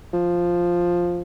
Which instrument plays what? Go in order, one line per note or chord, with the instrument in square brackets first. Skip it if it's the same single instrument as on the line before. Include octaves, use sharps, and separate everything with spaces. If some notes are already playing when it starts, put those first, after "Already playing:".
[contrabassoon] F3